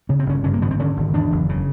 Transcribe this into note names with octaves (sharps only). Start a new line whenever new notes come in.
C#3 C#4
C4
G1 C#4
G2 C#4
A#3
G#1 B3
C4
D3 C#4
G#1
E2 D4
F#1
C#3